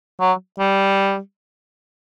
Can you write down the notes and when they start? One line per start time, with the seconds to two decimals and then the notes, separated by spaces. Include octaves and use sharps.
0.20 F#3
0.59 G3